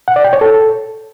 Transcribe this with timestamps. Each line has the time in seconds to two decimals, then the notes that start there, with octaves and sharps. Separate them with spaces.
0.08 F#5
0.16 D5
0.24 G5
0.33 C#5
0.41 A4